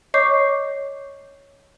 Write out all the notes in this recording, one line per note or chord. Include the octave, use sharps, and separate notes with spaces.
C#5 D#5 C#6 D6 G6 C7